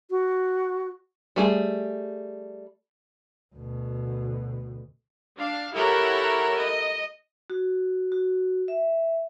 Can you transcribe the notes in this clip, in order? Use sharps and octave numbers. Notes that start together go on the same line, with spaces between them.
F#4
G3 A3 G#4
D2 B2
D4 F5
E4 G4 A4 A#4 C#5 F#5
D#5
F#4
F#4
E5